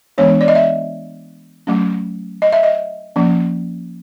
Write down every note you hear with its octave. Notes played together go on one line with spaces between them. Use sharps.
E3 G#3 B3 D4 C#5
D5
D#5
E5
F#3 A3 C#4
D#5
E5
D#5
F3 A#3 C#4